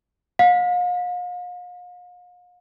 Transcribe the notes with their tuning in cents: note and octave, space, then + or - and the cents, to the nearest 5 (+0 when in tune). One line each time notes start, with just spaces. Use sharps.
F5 +40